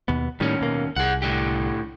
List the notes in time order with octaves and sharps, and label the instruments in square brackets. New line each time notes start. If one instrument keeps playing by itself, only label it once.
[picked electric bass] D#2 B2 B3
[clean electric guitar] D#2 C#4 [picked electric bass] A2 D#3 G3
[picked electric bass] B2 A#3
[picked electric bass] C2 [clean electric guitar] G#4 F#5
[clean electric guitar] A2 D3 G4